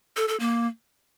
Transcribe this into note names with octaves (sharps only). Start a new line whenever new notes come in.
A4
A4
A#3